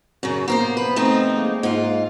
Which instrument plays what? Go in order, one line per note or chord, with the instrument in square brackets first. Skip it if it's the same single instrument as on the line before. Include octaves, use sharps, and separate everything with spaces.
[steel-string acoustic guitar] F#2 C#3
[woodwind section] C3 F3 B3 [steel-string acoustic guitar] A#3 A#4 C5
[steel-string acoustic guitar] B4
A3 C4 D#4
[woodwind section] G#3 A#3
[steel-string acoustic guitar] G#2 F4